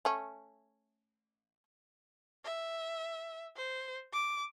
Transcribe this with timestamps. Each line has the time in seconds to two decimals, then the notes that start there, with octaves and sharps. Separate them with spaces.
0.05 A3 C#4
2.44 E5
3.56 C5
4.13 D6